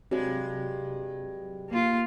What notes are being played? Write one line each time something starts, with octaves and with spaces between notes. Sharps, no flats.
G2 C3 F#3 G#3
A#3 F4